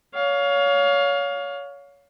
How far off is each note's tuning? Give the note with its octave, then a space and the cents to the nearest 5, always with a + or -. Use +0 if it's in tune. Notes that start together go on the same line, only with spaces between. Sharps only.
C#5 +25 F5 +20